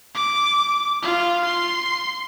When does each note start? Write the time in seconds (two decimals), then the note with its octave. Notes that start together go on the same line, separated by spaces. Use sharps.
0.15 D6
1.03 F4
1.45 C6